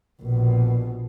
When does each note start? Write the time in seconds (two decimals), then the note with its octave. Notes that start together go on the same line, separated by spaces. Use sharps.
0.22 A#1 B2